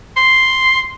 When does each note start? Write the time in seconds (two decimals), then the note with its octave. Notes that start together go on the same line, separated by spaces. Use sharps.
0.17 C6